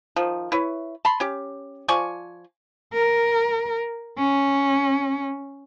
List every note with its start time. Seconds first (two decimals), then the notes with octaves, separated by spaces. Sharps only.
0.16 D#3 F3
0.52 E4 B4 C#5
1.05 A5 B5 C6
1.20 C#4 G4
1.88 F3 D5 G#5 C#6
2.94 A#4
4.18 C#4